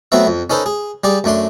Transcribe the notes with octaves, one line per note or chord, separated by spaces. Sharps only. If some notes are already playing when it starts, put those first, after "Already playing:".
F#3 A3 B3 C4 B4 E5
F2
C#4 D#4 A4 B4 C5
G#4
G3 G#4 D5
F#2 A3 D4 C6